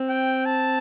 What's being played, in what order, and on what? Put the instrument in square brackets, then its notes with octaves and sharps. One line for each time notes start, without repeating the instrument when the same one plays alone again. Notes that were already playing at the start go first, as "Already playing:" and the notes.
Already playing: [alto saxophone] C4
[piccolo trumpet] G5
A5